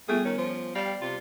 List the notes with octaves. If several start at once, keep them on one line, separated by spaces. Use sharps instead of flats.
G3 A3 B3 F4 G#4
D#3 C#4
F3
G3 D5 F5 G5
C3 F4